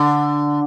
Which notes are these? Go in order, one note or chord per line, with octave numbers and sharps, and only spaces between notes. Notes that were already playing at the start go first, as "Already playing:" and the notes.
Already playing: D3